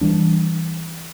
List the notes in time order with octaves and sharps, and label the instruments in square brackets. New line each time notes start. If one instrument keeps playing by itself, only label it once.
[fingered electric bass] E3 G3 D4